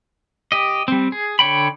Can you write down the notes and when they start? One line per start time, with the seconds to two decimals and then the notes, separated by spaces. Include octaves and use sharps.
0.52 G4 D#5
0.88 G3 C4
1.12 G#4
1.39 D3 C#5 G5 B5